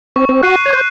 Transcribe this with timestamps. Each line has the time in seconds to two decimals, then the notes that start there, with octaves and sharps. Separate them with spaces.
0.16 C4 C#6
0.29 C4
0.43 F#4 F#6 C7 D#7
0.66 C#5
0.70 C5 C#6